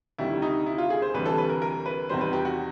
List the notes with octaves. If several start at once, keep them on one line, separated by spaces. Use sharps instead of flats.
D2 C3 D#3 G3 E4
D#4
E4
F4
G#4
C5
D2 C3 E3 G3 B4
A4
B4
A#4
A#4
B4
E2 C3 D#3 G3 C5
B4
G4
F#4